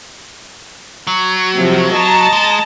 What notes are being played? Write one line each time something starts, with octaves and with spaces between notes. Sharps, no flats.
F#3
C3 F3
D#5 A5 A#5
G#3